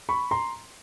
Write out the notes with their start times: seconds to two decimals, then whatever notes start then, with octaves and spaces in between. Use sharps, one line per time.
0.09 B5 C#6
0.31 A#5 C6